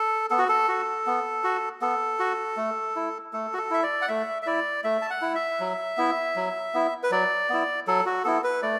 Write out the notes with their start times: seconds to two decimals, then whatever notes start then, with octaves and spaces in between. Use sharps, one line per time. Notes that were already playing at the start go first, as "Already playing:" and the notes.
Already playing: A4
0.30 B3 A4
0.39 F#4
0.48 A4
0.68 F#4
1.07 B3
1.44 F#4
1.82 B3 A4
2.20 F#4
2.57 A3
2.96 E4
3.33 A3 A4
3.54 F#4
3.58 A4
3.71 E4 E5
3.83 D5
4.02 F#5
4.08 A3 E5
4.42 E5
4.47 E4 D5
4.84 A3 E5
5.02 A5
5.10 F#5
5.22 E4
5.35 E5
5.60 F#3
5.97 B3 E4
6.36 F#3
6.74 B3 E4
7.03 B4
7.11 F#3 D5
7.50 B3 E4
7.87 F#3 A4
8.06 F#4
8.24 B3 E4 A4
8.44 B4
8.63 A3 D5